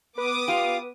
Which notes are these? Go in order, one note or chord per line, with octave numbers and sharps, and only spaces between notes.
B3 B4 D6 D#6
F4 G4 F5